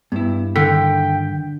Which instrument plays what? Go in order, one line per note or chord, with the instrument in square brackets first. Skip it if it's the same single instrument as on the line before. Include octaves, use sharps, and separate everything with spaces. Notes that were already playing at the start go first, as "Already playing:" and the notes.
[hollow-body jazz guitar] G2 E4 [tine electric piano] B3
[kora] D3 [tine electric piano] D#3 B6 [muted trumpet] G5